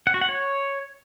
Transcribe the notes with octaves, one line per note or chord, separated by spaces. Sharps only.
F#5
F#4
F#5
C#5